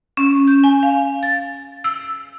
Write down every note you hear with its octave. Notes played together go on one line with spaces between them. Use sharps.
C#4
G6
G#5
F5
A6
E6